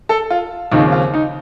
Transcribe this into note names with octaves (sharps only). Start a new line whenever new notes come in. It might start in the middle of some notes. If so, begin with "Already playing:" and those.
A4
F4
D#2 C#3 F3 C4 D#4
F4
D#4